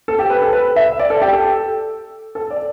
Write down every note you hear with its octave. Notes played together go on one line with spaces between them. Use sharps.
A4
G4
B4
A4
B4
E5
D5
A4
G4
A4
A4
D5